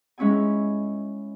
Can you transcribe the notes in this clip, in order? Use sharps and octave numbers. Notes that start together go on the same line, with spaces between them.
G#3 C#4 E4 G#5